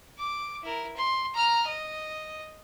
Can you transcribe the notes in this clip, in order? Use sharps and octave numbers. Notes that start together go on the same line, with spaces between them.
D6
E4 A#4
C6
A#5 F6
D#5